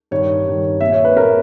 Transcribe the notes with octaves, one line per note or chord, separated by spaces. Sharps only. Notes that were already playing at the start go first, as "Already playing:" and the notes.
G2 D#3 C#5
G2 D#3
A#2 E5
C#5
B4
A#2 A#4